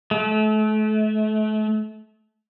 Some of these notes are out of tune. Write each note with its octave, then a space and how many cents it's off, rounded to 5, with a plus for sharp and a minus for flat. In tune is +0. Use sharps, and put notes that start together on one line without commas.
A3 -35